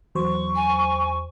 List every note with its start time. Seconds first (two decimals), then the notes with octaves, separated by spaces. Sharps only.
0.15 E2 F#3 C5 C#6
0.55 G#5